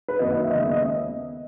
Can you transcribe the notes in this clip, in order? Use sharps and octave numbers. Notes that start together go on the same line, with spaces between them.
B4
F#2 D#3 A#3 D#5
D#5
E5
D#5
D#2 C#3 G#3 B3 E5
D#5